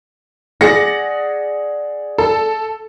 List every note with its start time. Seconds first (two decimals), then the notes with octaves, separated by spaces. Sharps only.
0.61 G#4 D5 F#5 A#6 C#7
2.18 A4